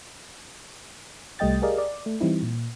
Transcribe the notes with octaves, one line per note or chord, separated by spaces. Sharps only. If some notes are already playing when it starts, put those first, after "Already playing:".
C2 G3 A3 D#5 G5 A6
G4 G#4 A#4 D5 D#5 F5
D5
A3
E3 G3 C4 D#4 E4
A#2